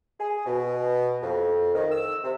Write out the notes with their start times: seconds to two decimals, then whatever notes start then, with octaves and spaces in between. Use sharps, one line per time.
0.19 G#4
0.46 B2
1.22 F2
1.75 D#3
1.92 E6
2.24 C3